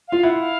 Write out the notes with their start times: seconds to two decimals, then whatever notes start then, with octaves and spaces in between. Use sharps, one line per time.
0.08 F4 F5
0.23 E4 F#5
0.39 F5